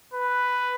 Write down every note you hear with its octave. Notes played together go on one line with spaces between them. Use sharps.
B4